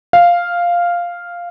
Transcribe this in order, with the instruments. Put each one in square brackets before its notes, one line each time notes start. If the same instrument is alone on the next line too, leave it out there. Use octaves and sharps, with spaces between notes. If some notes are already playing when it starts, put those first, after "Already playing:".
[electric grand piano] F5